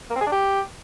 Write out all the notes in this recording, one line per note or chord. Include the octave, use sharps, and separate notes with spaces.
A#3
C4
G#4
D4
G4